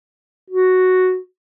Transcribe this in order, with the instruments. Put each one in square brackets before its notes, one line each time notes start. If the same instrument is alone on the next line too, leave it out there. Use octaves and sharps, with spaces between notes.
[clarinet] F#4